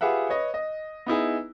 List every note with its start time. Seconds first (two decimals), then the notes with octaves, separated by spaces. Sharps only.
0.01 F4 G4 G#4 B4 E5 F#5
0.29 B4 C#5 D#5
0.54 D#5
1.06 B3 D#4 E4 G#4